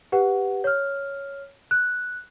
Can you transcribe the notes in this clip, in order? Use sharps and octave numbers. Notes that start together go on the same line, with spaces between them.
G4 B4 F#5
C#5 F6
F#6